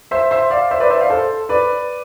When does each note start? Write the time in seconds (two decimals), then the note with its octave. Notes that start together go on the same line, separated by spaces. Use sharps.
0.11 C5 E5
0.31 C5 E5
0.50 D5 F5
0.71 C5 E5
0.80 B4 D5
0.90 C5 E5
1.00 D5 F5
1.10 A4 C5
1.49 B4 D5